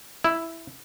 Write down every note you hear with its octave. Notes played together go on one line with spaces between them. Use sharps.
E4